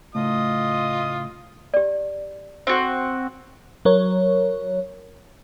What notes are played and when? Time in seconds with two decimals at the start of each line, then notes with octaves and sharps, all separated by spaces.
0.15 A2 C#3 A3 F4 D#5 D#6
1.74 G4 D5
2.67 C4 F#4 C5
3.85 F#3 A#4 C#5